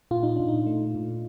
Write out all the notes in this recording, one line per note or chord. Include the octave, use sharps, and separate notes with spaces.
A#2 F4
D#4
A#2 D4
D#4
A3
A#2